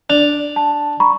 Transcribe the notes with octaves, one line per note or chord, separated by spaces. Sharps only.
D4 F7
A5
A#5 B5 C#6